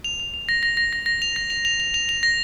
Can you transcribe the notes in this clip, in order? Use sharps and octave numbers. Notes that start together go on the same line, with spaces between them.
F7
F7
F7
A#6
A#6
A#6
A#6
A#6
F7
A#6
F7
F7
F7
F7
F7
A#6